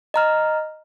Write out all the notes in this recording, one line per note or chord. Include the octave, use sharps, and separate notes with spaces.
D#5 A#5 F6